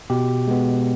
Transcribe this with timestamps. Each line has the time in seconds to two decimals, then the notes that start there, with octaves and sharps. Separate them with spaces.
0.10 B2 G4
0.48 G#3 B3